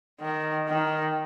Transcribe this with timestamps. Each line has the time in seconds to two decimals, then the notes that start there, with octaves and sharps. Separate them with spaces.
0.21 D#3
0.68 D#3